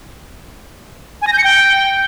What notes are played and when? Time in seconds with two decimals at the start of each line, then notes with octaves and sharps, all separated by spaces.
1.22 G#5
1.27 A#6
1.33 G6
1.38 C#7
1.44 G5